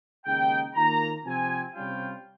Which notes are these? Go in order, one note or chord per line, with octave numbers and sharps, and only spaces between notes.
D#2 C#3 G#3 D#4 G5
D#2 D#3 A#3 F4 A#5
C3 F3 C4 G#5
C3 G3 C#4 F4 G5